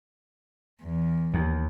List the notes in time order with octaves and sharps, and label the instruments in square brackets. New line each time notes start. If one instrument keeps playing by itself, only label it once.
[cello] E2
[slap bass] D#2